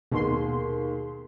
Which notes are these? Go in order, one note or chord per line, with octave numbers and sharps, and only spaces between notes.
D#2 B2 G#4 C6